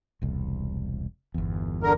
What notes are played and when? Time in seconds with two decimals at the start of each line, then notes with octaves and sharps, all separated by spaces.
0.22 E1 C2
1.34 G1 E2
1.83 D3 A#4